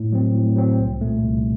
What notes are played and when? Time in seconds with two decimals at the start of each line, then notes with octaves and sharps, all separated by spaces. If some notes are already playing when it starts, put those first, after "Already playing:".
Already playing: A2
0.13 F#3 C4
0.34 A2
0.56 F#3 C4
0.79 C2
1.01 A#2 A3
1.23 C2